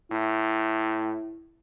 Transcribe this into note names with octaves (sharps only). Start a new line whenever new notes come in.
A2 E4